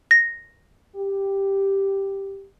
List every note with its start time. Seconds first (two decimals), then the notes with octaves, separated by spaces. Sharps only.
0.11 A#6
0.96 G4